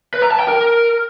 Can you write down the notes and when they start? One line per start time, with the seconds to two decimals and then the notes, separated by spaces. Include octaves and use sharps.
0.14 B4
0.22 A#5
0.31 A5
0.40 G5
0.48 A#4